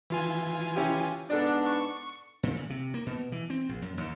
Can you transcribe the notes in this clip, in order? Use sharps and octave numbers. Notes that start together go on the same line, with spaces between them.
E3 F4 G#5
C#4 E4 G4
G#2 B3 D4 A4 D5
C#6
A#2
C#3
C3
A#3
B2
E3
C4
A#1
F#2
D#2